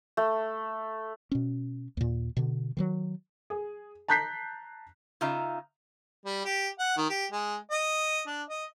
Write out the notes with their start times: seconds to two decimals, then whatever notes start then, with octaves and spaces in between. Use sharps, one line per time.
0.17 A3
1.31 B2 C#4
1.97 D#2 A#2
2.37 B2 D3
2.77 D#3 E3 F#3
3.50 G#4
4.08 A5 A#5 F#6 G6 B6 C7
5.21 C#3 D#4 F4 E5 A#5
6.26 G3
6.45 G4
6.79 F#5
6.97 D#3
7.10 G4
7.32 G#3
7.71 D#5
8.27 D4
8.50 D#5